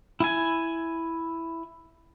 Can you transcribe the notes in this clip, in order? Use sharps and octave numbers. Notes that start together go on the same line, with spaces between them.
E4 G#5